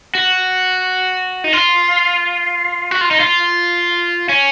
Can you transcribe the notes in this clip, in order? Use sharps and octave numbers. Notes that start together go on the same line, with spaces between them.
F#4
D#4
F4
F#4
F4
D#4
F4
C#4